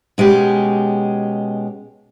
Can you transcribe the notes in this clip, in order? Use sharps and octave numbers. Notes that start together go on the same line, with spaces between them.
B2 G#3 C#4 G4